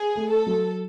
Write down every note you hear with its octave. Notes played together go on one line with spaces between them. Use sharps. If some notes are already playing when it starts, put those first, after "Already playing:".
Already playing: G#4
A3
A4
F#3